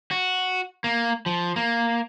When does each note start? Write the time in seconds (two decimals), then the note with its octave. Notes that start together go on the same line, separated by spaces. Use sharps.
0.11 F#4
0.84 A#3
1.26 F3
1.56 A#3